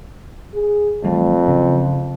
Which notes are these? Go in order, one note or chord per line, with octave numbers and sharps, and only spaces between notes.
G#4
F2 E3 G3 A3
D2 C#3 F#3